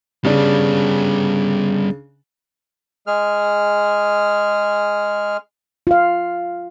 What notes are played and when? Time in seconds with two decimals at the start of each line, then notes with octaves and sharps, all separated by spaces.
0.25 C#3 G3 B3 D4
3.07 G#3 G#4 F6
5.87 F4 F5